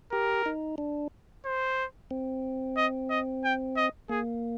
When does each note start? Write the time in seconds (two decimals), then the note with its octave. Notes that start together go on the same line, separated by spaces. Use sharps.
0.12 G4 A#4
0.46 D#4
0.78 D4
1.45 C5
2.11 C4
2.77 D#5
3.10 D#5
3.44 G5
3.77 D#5
4.09 A#3 G#4